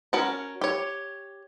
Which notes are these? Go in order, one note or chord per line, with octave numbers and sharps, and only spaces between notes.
C#4 F#4 A#4 A5
G4 C#5